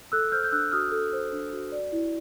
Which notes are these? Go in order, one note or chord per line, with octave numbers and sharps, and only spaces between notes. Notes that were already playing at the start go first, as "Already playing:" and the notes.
A4 E6 F#6
C5 F6 G6
G6
D4 E6 F#6
F#4 D#6 F6
A4
C5
D4
F#4
D5
E4